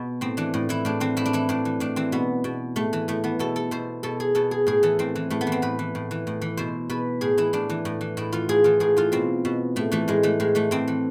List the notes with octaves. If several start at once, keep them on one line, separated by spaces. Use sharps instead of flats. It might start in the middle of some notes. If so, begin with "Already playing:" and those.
Already playing: B2 B3
A2 C4
E3 D4
A2
E3 E4
A2 D4
E3 C4
A2 E4
D4
E3 E4
A2 D4
E3
A2 D4
E3 C4
B2 B3
B2
A2 A3
E3
A2 A3
E3 B3
B2 A4
A4
B2 C5
B2 A4
G#4
B2 A4
G#4
A2 G#4
E3 A4
A2 C4
E3
A2 A3
B3
E3
C4
A2 B4
E3
A2
E3
A2
E3
B2 C5
B2 B4
A2 G#4
E3 E4
A2 D4
E3
A2
E3
A2 E4
E3 F4
A2 G#4
E3 F4
A2 G#4
E3 F4
B2 C4
B2
A2 A3
E3 A3
A2 G#3
E3 A3
A2 G#3
E3 A3
A2 C4
E3